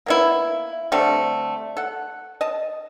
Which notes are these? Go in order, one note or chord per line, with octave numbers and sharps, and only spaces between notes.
A#3 B3 E4
D3 G3 A3 C4
A4 F#5
D#5 A5